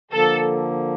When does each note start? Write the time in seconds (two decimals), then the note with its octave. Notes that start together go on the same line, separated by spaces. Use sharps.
0.12 D3 F3 A#3 A4